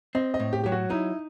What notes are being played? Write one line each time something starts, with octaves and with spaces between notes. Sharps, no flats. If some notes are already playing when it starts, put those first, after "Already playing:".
C4 D#5
D#5
A2
G4
F#3 G4
F#4
D#4 E4